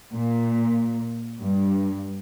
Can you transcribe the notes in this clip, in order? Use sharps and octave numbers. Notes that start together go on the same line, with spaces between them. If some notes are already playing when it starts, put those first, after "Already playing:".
A#2
G2